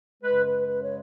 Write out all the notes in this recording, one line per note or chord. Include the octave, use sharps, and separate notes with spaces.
F#2 C#3 G#3 B4
B4
B4
C#5